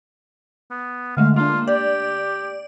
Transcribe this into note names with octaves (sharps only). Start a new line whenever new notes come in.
B3
D3 G#3 A3 F5
A#3 D4 F4
G4 D5